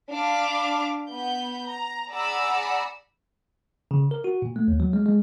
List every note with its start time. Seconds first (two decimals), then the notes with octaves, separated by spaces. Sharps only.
0.10 D4 F5 B5 D6
1.11 B3 B5 G6
1.67 A#5
2.11 G#4 D5 F#5 A#5 B5 E6
3.91 C#3
4.11 A#4
4.24 F#4
4.42 A#2
4.56 A3
4.68 D#2
4.80 F#3
4.93 G#3
5.06 G#3